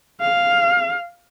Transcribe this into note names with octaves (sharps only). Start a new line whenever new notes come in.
F5